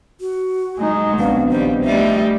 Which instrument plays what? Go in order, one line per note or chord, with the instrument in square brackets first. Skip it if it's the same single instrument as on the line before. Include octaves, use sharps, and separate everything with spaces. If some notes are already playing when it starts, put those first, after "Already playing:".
[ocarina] F#4
[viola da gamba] F#3 [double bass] G#3 D#4
[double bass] A#1 [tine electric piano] B3 C4 D4 [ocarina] F5
[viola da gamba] D#3 G3 [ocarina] C5
[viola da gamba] G3 A3 D#4 [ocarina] E5